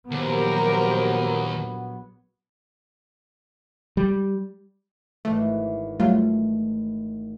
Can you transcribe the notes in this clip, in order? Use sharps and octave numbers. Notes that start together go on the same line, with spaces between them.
A#1 D#2 F#3 B3 G4 A#4 C5
G3
G#1 E3 A3
F#3 G3 A3 F4